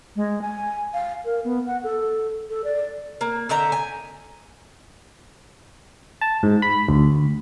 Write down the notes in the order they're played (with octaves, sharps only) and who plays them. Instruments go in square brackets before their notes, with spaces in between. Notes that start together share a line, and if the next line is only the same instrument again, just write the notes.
[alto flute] G#3
G#5
F5
A#4
B3
F#5
A4
A4
D5
[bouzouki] A#3
D3 D#4 E5 A#5
G#5
[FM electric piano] A5
G#2
B5
D2